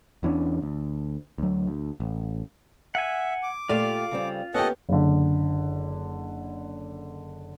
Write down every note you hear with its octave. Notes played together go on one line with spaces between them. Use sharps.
E2 E3 C#4 D4
D2
D2 F#3
D2
A1
E5 F#5 G#5
D6
A#2 A3 F4 G4 D5 F5
C#3 G3 C4
A#3 B3 C#4 G4 A4 D#5 F#5
F#1 D3